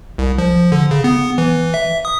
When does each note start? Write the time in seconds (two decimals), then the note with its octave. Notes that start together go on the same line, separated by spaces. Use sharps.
0.18 C2
0.38 F3
0.72 D3
0.91 C#3
1.04 B3
1.38 E3
1.74 E5
2.05 D#6